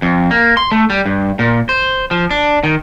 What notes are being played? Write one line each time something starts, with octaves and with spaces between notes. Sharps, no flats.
F2
A#3
C6
A3
G3
G2
A#2
C5
F3
D4
D#3